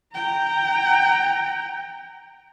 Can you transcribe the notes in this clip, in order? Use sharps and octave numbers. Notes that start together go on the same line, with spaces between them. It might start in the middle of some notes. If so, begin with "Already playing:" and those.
G5 A#5